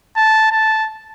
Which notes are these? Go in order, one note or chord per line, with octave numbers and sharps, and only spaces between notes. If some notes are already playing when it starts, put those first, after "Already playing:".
A5
A5